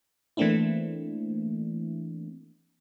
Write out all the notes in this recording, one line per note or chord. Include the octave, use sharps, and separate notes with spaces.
E3 A3 A#3 C4 D4 E4